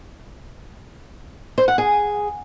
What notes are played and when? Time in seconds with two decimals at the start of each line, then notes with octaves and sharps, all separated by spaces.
1.58 C5
1.68 F#5
1.78 G#4